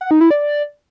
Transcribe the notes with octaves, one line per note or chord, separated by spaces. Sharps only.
F#5
D#4
E4
D5